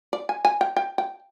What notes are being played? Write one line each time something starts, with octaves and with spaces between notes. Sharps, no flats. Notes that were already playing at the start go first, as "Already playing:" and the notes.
D5
G#5
G#5
G5
G5
G5